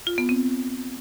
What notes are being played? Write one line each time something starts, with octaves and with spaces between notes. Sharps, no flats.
F4
B3
C4